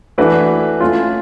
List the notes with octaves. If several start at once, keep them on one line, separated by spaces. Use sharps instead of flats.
E3 A3 D4 F#4 B4
A3 C#4 F4